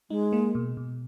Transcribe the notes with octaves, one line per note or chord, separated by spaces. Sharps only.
G#3 D#4
A#3
B2
B2